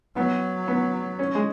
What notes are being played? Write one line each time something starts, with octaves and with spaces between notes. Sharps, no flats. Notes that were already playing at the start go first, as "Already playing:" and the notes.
F#3 B3
B3
C#4
G#3